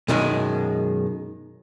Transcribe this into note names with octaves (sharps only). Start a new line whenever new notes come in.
F#2 B2 D#3 G#3